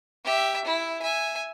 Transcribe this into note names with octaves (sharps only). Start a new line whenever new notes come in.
G4 E5
E4
E5 G#5